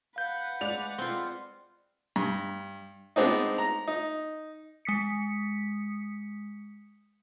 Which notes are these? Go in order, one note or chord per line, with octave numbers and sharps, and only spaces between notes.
B4 F5 F#5 G6
G#3 D5 F7
C4 F4
G2
G#3 B3 C4 D4 D#4
A#5
D#4
G#3 D#6 B6 C#7